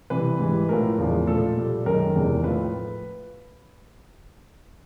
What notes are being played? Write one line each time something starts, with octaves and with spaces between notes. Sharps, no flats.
C3 E3 G3 B4
G#2 E3 G3
A2 F3 A3 A#4
E2 C#3 F3 G#3
A#2 F3 A3 A4
A#2 G3
F#2 D#3 G#3 A#4
E2 C3 D#3 G#3
A2 F3 A3 B4